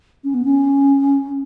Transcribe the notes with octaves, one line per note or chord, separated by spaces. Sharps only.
C#4
B3
C#4